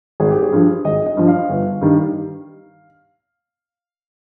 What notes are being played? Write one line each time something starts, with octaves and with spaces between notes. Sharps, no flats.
G#1 G#4
G4
G#4
G2 F3
G#1 D#5
D#5
G2 F3
F5
G1
G2 D#3 G3